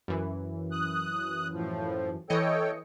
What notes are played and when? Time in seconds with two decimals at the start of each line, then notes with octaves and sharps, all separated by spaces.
0.08 F#2 E3
0.72 D#6 F#6
1.52 A2 F3
2.30 E3 A4 C#5 D#5 G5 C#7